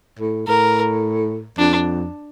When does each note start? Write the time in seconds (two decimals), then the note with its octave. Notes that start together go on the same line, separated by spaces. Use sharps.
0.19 A2
0.47 A2 A#4
1.58 F2 D4